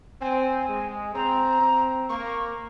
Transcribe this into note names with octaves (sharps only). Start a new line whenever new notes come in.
C4 G#5
G#3
C4 A#5
C4
A#3 C#6